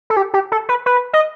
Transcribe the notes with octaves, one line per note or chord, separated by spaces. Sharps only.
A4
G4
G4
A4
B4
B4
D#5